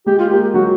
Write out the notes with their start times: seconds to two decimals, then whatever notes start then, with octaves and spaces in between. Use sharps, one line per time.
0.06 G#3 G4
0.19 F4
0.30 A#3 G4
0.54 F#3 F#4